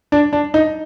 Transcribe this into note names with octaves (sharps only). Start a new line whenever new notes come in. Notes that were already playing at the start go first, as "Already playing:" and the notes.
D4
D4
D#4